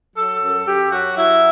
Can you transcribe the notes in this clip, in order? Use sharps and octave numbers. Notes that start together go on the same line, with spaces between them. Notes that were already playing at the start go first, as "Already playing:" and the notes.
F#3 A4
F#2
F#2 G4
F#3 F#4
F#3 E4